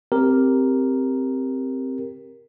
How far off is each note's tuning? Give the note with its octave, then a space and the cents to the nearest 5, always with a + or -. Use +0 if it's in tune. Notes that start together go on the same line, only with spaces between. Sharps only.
C4 +0 G4 +0 A#4 +0